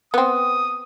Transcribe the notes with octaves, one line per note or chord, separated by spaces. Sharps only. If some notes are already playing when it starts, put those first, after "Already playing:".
B3 C4 D#6